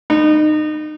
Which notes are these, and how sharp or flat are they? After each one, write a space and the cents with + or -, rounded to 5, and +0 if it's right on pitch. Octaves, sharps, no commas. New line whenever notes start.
D#4 -30